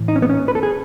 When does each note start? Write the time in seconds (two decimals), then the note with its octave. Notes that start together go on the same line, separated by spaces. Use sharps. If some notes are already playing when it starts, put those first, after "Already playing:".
Already playing: A2 E3
0.08 D#4
0.16 C#4
0.22 B3
0.30 C#4
0.48 B4
0.55 A4
0.63 G#4